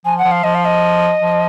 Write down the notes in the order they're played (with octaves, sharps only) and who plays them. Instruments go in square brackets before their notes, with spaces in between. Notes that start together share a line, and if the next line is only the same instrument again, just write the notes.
[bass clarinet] F3 [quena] G#5
[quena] F#5
[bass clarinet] F3
[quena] F5
[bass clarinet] F3 [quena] D#5
[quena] F5
D#5
[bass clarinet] F3